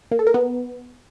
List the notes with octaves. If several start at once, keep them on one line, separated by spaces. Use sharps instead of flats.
A#3
A4
A#4
B3